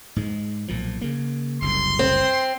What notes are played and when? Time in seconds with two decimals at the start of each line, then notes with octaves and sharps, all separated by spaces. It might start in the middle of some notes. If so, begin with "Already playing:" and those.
0.16 G#2 G#3
0.68 B1 A#2 F3
1.01 C#3 A#3
1.62 F#1 C2 F#2 C6
1.99 C4